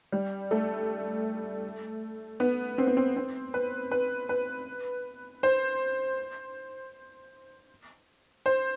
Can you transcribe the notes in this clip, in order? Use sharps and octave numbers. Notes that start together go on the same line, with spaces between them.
G3
A3
B3
C4
B3
C4
C4
B4
B4
B4
C5
C5